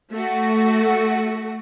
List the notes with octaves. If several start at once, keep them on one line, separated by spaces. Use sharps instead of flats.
A3 F#4